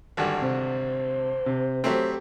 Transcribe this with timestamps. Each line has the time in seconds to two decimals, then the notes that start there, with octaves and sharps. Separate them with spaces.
0.17 G#1 G2 D3 G#5
0.42 C3 C5
1.46 C3
1.84 F#3 A3 C4 G4 A4